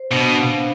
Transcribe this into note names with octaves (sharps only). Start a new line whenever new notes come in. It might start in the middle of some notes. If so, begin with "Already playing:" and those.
Already playing: C5
B2 D4
F5